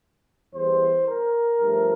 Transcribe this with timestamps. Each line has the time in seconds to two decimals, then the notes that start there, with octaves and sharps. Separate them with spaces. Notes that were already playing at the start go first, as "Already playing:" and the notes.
0.54 E2 E3 G3 C5
1.08 A#4
1.61 G2 F3 A3